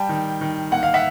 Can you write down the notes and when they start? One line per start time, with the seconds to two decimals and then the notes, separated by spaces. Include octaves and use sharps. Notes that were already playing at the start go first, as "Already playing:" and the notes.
Already playing: G3 G5 A5
0.09 D#3
0.41 D#3
0.72 A#3 F#5
0.83 F5
0.94 E5 F#5